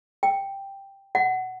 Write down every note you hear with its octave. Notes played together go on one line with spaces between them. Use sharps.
G5
F#5